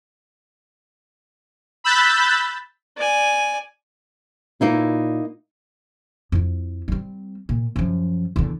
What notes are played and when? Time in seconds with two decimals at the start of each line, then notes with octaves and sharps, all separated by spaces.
1.84 B5 E6 F#6 G6 A6 B6
2.97 D5 G#5
4.61 A#2 A#3 D#4 E4
6.32 F2 E4
6.88 G3 C4
7.49 A#2
7.76 F#2 F3
8.36 E2 D3